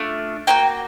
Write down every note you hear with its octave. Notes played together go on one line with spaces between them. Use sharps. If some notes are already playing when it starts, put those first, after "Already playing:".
Already playing: A3 D4 F4
A#3 D#4 F#4 G5